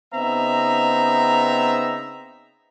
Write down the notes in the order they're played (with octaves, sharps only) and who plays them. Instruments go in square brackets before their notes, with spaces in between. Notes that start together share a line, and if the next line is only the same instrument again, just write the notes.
[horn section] C#3 B3 C4 D#4 E5 A#5